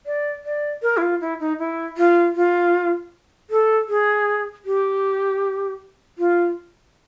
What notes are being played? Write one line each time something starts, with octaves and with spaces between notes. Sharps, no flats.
D5
D5
A#4
E4
F4
E4
D#4
E4
F4
F4
A4
G#4
G4
F4